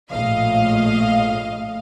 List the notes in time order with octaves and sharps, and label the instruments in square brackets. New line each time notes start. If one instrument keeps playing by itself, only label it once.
[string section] A#1 A2 D#5 F5